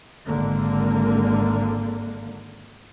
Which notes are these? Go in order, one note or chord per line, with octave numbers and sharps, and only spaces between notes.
G#1 D3 A#3